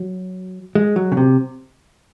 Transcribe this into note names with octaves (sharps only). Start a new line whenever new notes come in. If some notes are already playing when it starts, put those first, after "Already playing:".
Already playing: F#3
G#3
F#3
C#3
C3